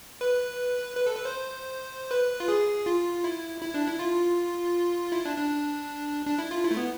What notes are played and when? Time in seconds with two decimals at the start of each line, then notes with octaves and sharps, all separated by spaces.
0.21 B4
0.97 B4
1.07 A4
1.16 B4
1.25 C5
2.11 B4
2.40 F4
2.48 G#4
2.86 F4
3.24 E4
3.61 E4
3.74 D4
3.87 E4
3.99 F4
5.12 E4
5.25 D4
5.38 D4
6.26 D4
6.39 E4
6.51 F4
6.64 E4
6.71 A3
6.77 B3